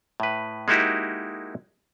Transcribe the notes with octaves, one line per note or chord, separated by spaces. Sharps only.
A2 B4
G#3 A#3 D#4 E4 F#4 G4